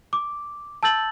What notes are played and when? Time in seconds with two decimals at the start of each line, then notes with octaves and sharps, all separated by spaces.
0.13 D6
0.83 A5 E6 G6 A6 F#7